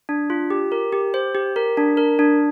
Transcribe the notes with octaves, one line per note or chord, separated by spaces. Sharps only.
D4
F4
G4
A#4
G4
C5
G4
A#4
D4
A#4
D4